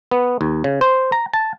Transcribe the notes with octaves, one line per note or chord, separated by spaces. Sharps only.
B3
D#2
C#3
C5
A#5
A5